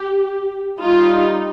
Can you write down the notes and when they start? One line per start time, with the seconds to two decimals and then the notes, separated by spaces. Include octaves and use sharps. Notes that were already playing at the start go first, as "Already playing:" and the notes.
Already playing: G4
0.80 G3 D#4 F4